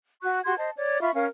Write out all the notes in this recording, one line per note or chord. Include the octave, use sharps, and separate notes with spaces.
F#4 C#6 F#6
F#4 G4 C6 G#6
C5 D#5 A5
C#5 D5
F4 E5 B5 C#6
C#4 A#4 F5